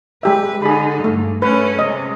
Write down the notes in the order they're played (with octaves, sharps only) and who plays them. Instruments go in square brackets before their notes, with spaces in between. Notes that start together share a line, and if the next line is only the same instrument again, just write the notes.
[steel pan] G#3 G4 E5 [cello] B4
[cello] D3 D#4 [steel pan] G#4 B5
[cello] G2 [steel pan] A3
[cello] A3 C#4 [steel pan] B4
[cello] C3 G#3 [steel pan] D#5